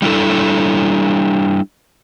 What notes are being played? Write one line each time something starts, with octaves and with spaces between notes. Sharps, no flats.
G3 D4 E4 A4